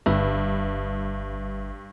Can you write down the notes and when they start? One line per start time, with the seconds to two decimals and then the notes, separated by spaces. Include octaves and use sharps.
0.06 G1 G2 B4 E5